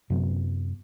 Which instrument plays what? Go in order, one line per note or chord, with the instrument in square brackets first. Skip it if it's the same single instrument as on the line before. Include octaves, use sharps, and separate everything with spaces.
[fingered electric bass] F#2 C3 F#3 B3